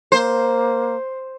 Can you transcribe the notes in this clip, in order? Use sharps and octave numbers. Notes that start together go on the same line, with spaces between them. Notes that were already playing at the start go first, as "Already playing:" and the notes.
A#3 C5